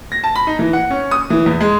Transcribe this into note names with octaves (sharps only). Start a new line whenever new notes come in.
A#6
A5
B5
D#4
E3
F#5
C#4
D#6
E3
E2
G#3